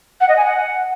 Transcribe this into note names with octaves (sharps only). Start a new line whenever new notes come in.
F#5
D#5
G#5
F#5